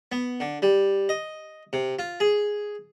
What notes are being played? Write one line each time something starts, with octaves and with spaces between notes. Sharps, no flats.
B3
D3
G3
D#5
C3
F4
G#4